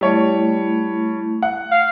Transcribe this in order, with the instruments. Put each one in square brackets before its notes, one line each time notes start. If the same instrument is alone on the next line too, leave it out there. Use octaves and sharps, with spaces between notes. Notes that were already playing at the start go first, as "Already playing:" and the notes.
[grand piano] G3 C#5 [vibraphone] A3 E4
[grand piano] F#5
[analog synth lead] F5